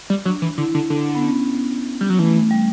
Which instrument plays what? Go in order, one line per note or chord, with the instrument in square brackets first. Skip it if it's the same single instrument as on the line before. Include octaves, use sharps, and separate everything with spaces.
[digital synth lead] G3
[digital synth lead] F#3 [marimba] D4
[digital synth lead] E3
[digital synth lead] D3 [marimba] E4
[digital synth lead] D3
[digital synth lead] D3 [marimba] D4
[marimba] B3
C#4
B3
[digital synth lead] G3
F#3
[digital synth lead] E3 [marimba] A3
[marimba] G3